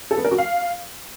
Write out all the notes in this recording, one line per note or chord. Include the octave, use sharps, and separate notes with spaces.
A4
B3
A#4
F#4
F5